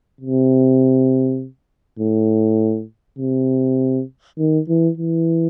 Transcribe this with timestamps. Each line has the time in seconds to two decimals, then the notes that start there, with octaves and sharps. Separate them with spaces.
0.21 C3
1.99 A2
3.19 C3
4.38 D#3
4.69 E3
4.98 E3